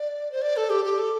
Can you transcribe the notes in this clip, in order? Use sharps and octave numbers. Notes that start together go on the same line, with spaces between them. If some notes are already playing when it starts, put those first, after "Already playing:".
Already playing: D5
C5
D5
A4
G4
G4
A4